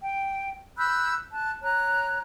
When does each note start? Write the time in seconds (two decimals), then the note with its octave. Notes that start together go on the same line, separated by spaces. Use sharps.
0.02 G5
0.78 B5 E6 F#6 G6
1.32 A5 F#6
1.61 C#5 A#5 F#6